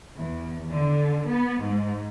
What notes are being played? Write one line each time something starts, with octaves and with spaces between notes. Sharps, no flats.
E2
D3
B3
G#2